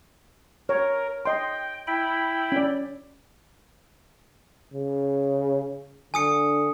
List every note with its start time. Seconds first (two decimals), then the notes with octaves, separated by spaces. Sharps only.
0.69 A#4 C#5
1.25 D#5 G5 C6
1.87 E4 G5 B5
2.52 C#4 D5
4.74 C#3
6.14 D3 G#5 D#6 C#7